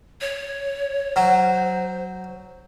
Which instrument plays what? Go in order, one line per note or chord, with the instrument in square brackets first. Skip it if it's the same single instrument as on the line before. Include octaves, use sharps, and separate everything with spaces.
[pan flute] C#5
[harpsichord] F#3 [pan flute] C5